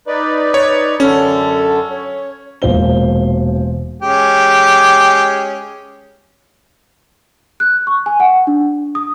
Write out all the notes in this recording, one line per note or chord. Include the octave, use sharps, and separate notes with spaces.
D#4 B4 D5
C#5
F#2 D3 C#4 A4
C#5
E1 A#2 C5 G7
G#3 C#4 G4
F#6
C#6
G#5
F#5
D4
D#6